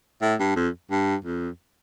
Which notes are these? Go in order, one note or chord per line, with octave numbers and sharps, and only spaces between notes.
A2
G2
F2
G2
F2